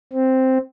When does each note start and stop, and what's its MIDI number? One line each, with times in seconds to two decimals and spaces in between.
0.13 0.58 60